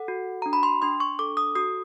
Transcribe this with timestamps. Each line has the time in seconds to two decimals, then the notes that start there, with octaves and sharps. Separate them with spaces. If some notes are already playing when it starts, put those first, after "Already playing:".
Already playing: A4 F#5
0.08 F#4
0.42 D4 A#5
0.53 B5
0.63 C6
0.82 D4 C6
1.00 C#6
1.19 A4 D6
1.37 D#6
1.55 F#4 D#6